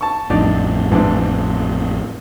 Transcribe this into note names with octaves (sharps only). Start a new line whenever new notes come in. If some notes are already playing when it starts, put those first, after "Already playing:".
A5 C#6
A1 F2 A2 D4 D#4 D5
G#2 E3 D4